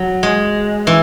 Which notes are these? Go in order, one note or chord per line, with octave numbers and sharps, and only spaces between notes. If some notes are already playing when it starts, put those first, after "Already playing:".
Already playing: F#3
G#3
E3